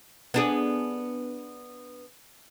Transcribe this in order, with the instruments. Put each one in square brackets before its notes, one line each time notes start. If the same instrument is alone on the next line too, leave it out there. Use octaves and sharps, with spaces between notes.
[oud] B3 D4 G#4